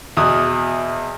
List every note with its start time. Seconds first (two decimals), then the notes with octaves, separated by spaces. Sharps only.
0.17 E2 B2 D#6 F#6